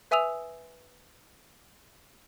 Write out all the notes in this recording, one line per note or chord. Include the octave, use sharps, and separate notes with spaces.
B4 E5 G#5 D#6 E6 F7